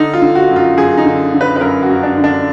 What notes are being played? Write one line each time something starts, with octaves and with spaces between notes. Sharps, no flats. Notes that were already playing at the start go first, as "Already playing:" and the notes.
Already playing: D3 D#4
F4
D3
F#4
F#2
F4
F#2 G#4
D#4
D3
D3
B4
B4
F#2 A#4
F#4
F#2
D4
D3
D4